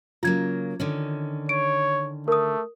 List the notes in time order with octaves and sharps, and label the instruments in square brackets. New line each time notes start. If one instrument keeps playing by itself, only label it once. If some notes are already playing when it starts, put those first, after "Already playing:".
[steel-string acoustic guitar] C#3 F#3 A#3 [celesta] F4 G#6
[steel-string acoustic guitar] D3 D#3 C#4
[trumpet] C#5 [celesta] D7
[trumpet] A3 [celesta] A#4 D#6